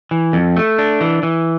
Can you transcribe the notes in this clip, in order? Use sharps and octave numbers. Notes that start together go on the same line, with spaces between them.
E3
F2
A3
D4
E3
E3